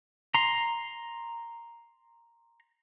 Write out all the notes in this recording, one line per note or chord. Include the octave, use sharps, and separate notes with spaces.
A#5 C6